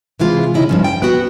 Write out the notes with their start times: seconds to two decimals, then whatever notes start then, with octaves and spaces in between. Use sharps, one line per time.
0.19 C3 E3 G#3 F4
0.54 C#3 D#4 E4 D#5
0.69 G2 F3 C#4
0.84 G5
1.02 B3 F#4